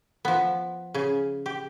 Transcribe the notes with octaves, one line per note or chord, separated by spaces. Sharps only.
F3 B3
C#3 G#4
G4